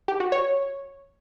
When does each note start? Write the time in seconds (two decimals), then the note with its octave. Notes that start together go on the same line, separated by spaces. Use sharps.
0.08 G4
0.20 F#4
0.32 C#5